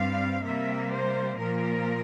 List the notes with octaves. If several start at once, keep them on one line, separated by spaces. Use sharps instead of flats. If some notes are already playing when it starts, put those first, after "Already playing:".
Already playing: G2 G3 C4 F5
C3 G3 A#3 E5
C5
A#2 F3 A#3 A#4